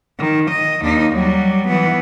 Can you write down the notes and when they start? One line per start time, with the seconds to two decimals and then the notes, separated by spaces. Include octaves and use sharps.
0.19 D#3
0.51 D#5
0.83 D#2 D#4
1.15 F#3 G3
1.68 E3 B3